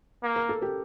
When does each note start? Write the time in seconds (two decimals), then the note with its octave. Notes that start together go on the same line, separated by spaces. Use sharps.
0.23 A#3
0.36 A#4
0.49 A4
0.61 G4 A#4